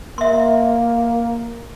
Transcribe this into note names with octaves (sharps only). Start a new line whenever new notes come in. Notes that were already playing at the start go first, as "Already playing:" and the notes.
A#3 E5 C6